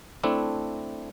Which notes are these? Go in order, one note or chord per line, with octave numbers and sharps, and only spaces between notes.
A3 C4 D4 E4